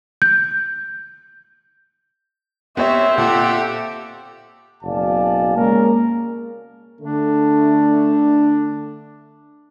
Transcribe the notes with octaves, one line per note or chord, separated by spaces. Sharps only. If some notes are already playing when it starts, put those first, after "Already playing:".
G6
B3 C4 G4 C#5 E5
A#2 G4 A4 E5 F#5
F#1 B2 D5 F5 G#5 A5
G#3 A#3 C#4 A#4
D3 A3 D4